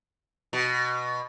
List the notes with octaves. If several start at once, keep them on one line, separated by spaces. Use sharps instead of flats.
B2